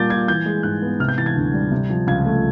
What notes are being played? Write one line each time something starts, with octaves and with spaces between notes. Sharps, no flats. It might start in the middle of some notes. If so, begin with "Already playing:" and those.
Already playing: A#2 G3 A#3 D6 G6 A6
A#2 G#6
E3 G6
G#3
G#2 F#6
B3
C3 F6
G6
E3 A6
G#6
D2
G3
C3
F3
C#2 G#6
A3